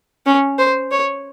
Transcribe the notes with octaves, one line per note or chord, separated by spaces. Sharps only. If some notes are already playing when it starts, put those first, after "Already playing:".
C#4
C5
C#5